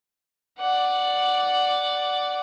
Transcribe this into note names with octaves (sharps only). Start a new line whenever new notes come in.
D5 F#5